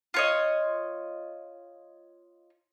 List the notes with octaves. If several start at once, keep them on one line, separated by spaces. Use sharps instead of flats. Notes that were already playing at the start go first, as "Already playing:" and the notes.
F4 C#5 D#5